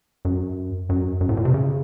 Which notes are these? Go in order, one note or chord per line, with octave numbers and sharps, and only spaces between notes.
F#2
F#2
F#2
A2
A#2
C3
C#3